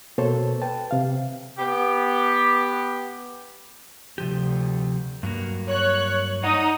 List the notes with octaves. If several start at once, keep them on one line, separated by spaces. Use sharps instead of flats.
B2 A#3 A4 C5 C#5 A5
B4 G5 A5
C3 F5
B3 G4
D2 C3 F3 G4
G2 F#3 A#3
C#5 F#6
D#4 C#5 D5 F#5 D#6